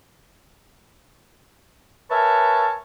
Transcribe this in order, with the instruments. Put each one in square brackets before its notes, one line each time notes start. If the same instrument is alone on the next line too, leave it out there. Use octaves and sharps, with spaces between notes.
[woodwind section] A#4 B4 C#5 E5 G#5 A5